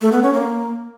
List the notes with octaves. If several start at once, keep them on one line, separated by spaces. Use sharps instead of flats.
A3
B3
C#4
A#3